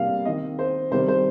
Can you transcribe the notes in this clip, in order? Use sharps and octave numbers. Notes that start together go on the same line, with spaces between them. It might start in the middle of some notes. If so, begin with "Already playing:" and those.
Already playing: C3 G3 A#3 F5
D#3 C4 D#5
C5
C3 D#3 G3 C5
C5